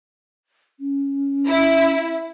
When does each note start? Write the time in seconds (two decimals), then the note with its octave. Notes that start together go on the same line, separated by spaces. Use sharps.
0.80 C#4
1.48 E4